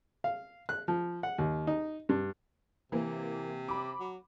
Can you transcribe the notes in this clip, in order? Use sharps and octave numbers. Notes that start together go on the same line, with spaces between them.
F5
F#6
F3
F#5
D#2
D#4
G2
C3 E3 A#3
B5 D6
F#3